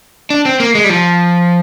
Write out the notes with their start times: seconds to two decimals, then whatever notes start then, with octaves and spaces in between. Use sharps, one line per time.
0.30 D4
0.45 C4
0.60 A#3
0.75 G#3
0.84 G3
0.89 F3